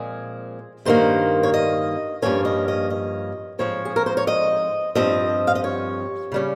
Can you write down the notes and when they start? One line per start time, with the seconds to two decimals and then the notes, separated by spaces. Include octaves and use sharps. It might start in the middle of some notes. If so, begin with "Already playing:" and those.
Already playing: A#2 F3 G#3 C4 G#4
0.85 G2 D#3 A#3 C5
1.43 C#5
1.54 D#5
2.22 G2 F3 A#3 C#4 C#5
2.45 D#5
2.68 D#5
2.90 D#5
3.59 G#2 F3 C4 C#5
3.85 G#4
3.96 A#4
4.06 C5
4.17 C#5
4.27 D#5
4.95 G2 F3 C4 D#5
5.47 F5
5.55 D#5
5.64 C#5
6.32 C#3 G3 C#4